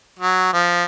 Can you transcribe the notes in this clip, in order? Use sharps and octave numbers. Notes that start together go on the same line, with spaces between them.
F#3
F3